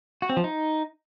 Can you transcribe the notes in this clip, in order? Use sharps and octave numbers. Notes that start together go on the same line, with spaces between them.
F#4
C4
F3
D#4